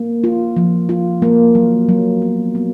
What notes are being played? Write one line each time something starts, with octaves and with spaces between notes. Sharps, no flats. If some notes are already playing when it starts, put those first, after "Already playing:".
Already playing: A#3
F4
F3
F4
A#3
F#3
F#3
B3
B3